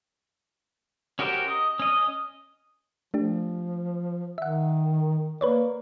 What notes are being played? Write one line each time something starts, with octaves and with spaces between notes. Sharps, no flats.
C#4 F#4 G4 A#4 C5
D#5
C#4 D#5
F3 A3 D4 G4
D#3 E5 F#5
A#3 B4 C#5 D5